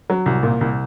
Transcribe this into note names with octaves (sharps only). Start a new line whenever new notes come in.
F#3
C2
A#2
C2